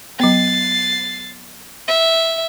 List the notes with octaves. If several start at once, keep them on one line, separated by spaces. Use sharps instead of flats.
F#3 B3 A6 C7
E5